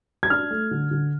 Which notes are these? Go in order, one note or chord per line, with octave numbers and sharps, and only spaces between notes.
G#6
D4 F6
A3
D3
D3